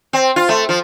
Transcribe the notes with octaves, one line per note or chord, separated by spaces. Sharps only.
C4
F4
A3
F3